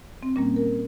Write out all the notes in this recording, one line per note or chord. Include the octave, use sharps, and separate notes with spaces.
C4
A#2 G3 A#3 C#4
A#4